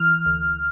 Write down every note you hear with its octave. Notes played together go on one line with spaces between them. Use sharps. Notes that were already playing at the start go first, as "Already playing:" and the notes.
Already playing: E3 F6
D2